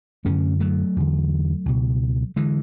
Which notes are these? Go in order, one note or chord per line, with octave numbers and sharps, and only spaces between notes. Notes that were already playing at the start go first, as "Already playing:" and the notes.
F#2 D3 A3 C#4
F#3 A3
E2 D3
C#2 B2
D3 E3 G#3